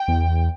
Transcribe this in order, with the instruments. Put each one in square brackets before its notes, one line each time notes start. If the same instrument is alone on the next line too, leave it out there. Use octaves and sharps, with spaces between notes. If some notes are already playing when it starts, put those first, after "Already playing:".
Already playing: [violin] G5
[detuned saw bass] E2